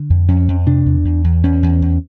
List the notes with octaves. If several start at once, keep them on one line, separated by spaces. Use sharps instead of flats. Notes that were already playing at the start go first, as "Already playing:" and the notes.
Already playing: D3
F2
F2 C#4
F2
C3 D4
E2
E2
E2
E2 C#4
E2
E2